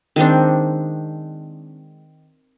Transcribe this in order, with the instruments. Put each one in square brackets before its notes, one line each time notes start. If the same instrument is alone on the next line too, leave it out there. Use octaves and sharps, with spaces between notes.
[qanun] D#3 G#3 C4 D4